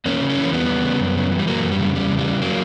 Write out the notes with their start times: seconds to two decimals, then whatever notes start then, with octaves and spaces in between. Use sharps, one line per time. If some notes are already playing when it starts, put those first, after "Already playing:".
0.06 E2 A#3 C#4
0.21 C#3
0.30 A#3 C#4
0.37 E3
0.53 E2 G3 B3
0.69 E2
0.84 C#3
1.00 F#2
1.16 C#3
1.32 E3
1.39 G3
1.47 F#2 F#3 A#3
1.63 F#2
1.72 G3
1.80 C#3
1.95 E2 G3
2.11 C#3
2.19 G3
2.26 E3
2.42 F#3 A#3